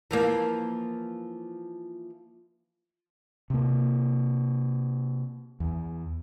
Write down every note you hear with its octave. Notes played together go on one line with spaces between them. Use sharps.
E3 F3 A#3
C3 A#3
E2